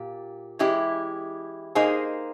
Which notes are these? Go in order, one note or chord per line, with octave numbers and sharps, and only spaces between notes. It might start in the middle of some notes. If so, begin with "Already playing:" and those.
Already playing: A#2 G4
E3 G#3 C#4 E4 G4
A#3 D#4 G#4 C5